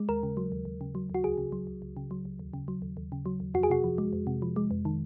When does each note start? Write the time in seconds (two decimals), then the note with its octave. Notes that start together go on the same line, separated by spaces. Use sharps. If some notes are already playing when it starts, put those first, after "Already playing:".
Already playing: G#3
0.09 D#2 A#4
0.23 C#3
0.37 F#3
0.52 D#2
0.65 D#2
0.81 C#3
0.95 F#3
1.10 D#2 F#4
1.24 C#2 G#4
1.38 C#3
1.52 F#3
1.67 C#2
1.82 C#2
1.97 C#3
2.11 F#3
2.25 C#2
2.39 D#2
2.53 C#3
2.68 F#3
2.82 D#2
2.97 D#2
3.12 C#3
3.26 F#3
3.40 D#2
3.54 F2 F#4
3.63 G#4
3.70 C3 F#4
3.84 F3
3.98 G#3
4.13 F2
4.27 C3
4.42 F3
4.56 G#3
4.71 F2
4.85 D#3